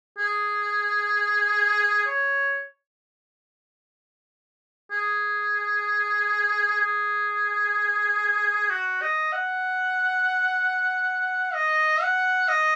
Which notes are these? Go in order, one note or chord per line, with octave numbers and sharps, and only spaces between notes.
G#4
C#5
G#4
G#4
F#4
D#5
F#5
D#5
F#5
D#5